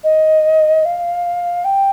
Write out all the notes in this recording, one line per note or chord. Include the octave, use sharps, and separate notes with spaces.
D#5
F5
G5